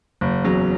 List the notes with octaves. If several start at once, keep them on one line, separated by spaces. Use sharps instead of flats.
F#1
E2 C#3 F#3